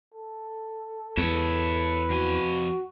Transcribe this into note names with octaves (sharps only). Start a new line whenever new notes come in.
A4
E2 B4 C#5 E5
F2 F#4 G#5